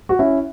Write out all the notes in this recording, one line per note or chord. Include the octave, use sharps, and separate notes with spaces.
F#4
C#4 E4